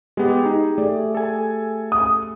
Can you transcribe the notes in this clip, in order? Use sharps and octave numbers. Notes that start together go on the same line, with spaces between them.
G#3 B3 G4
D#4 G#4
A3 G#4 D5
A4 G#5
D#6